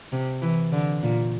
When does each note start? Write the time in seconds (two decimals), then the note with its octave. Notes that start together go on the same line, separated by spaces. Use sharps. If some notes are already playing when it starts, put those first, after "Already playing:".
0.12 C3
0.42 E3
0.72 D3
1.03 A#2